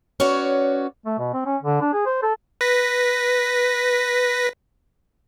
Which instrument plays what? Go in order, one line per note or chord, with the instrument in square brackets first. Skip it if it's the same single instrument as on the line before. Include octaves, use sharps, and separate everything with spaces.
[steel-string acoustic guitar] C#4 F#4 B4 C#5 D5
[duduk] A3
B2
C4
C#4
D3
D4
G#4
C5
A4
[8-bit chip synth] B4 A#6 B6